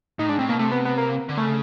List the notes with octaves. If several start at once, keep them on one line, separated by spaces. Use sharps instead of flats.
A2 D#4
G#2 D4
A2 C4
B2 A#3
C3 A3
B3
B3
A#3
D3
C#3 A3